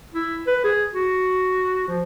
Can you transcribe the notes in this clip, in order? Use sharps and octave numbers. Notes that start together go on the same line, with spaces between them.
E4
B4
G#4
F#4
F3